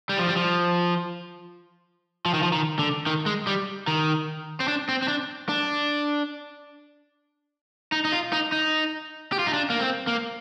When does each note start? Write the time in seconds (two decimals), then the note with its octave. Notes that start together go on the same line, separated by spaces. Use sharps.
0.09 G3
0.18 F3
0.28 G3
0.36 F3
2.25 F3
2.34 D#3
2.43 F3
2.52 D#3
2.79 D3
3.06 D#3
3.26 G#3
3.47 G3
3.87 D#3
4.60 C4
4.68 D4
4.89 C4
5.02 C4
5.08 D4
5.49 D4
7.92 D#4
8.05 D#4
8.12 F4
8.33 D#4
8.52 D#4
9.32 G4
9.39 F4
9.47 D#4
9.53 D4
9.70 A#3
9.80 C4
10.07 A#3